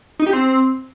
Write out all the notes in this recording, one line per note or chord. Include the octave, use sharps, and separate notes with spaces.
D#4
G4
C4